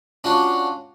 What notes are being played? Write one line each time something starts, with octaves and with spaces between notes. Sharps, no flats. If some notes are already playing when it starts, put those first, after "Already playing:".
C#4 D4 F4 F#4